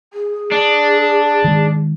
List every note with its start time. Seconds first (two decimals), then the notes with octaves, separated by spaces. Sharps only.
0.13 G#4
0.52 D4
1.44 D#3 G#3